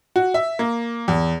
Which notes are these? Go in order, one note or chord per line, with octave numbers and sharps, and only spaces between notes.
F#4
E5
A#3
E2